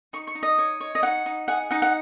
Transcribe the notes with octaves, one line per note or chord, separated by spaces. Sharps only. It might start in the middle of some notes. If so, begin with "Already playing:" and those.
D#4 C#6
C#6
D#4
D#5
C#5
C#5
D#5
D#4 F#5
D#4
G#4 F#5
D#4 F#5
F#5